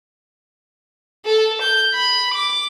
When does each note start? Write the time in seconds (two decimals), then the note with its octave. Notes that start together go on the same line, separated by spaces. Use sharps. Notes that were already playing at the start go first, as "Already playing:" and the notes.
1.25 A4
1.62 G6
1.94 B5
2.34 D6